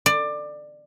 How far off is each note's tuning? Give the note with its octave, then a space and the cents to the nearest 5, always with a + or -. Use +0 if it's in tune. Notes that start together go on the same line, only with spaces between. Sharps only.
D5 +20